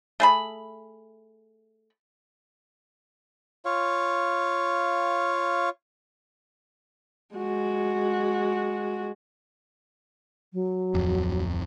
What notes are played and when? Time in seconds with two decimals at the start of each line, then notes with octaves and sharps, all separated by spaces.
0.20 A3 G#4 B5
3.65 F4 C#5 F5
7.35 G#3 F#4
10.53 F#3
10.94 D1 F2